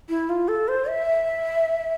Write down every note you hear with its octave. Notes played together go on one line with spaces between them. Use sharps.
E4
F4
A4
C5
E5